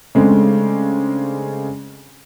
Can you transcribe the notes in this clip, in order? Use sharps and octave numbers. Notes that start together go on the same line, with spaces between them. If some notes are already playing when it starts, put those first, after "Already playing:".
C#3 G#3 A3 C4 D4